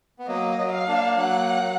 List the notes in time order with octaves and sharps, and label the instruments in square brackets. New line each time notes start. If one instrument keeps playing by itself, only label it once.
[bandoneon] B3
[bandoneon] F#3 A#3 [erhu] D#5
[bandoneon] F#3
[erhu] F5
[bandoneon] A#3 D4
[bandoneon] F#3 A#3 [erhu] F#5
[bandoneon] F#3